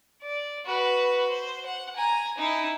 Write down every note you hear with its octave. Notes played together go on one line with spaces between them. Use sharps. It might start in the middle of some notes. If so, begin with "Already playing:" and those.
D5
F#4 B4
C5
F#5
G#5 A#5
D#4 E4